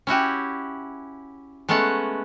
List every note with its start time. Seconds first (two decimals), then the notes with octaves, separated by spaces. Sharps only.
0.07 C#4 E4 F#4 G4
1.69 G#3 A3 B3 C#4 F#5